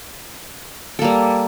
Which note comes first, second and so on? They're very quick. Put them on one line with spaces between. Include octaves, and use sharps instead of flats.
A4 A#3 G3